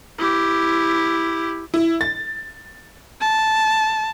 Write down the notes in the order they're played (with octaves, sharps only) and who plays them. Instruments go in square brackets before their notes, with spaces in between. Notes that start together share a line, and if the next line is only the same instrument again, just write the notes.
[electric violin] E4 G4
[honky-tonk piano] E4
A6
[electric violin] A5